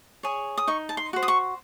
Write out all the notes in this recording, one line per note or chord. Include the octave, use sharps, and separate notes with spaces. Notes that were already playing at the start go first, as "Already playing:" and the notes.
G#4 C#5
D#6
D#4 C#6
A5
C6
F#4 C5
D#6
C#6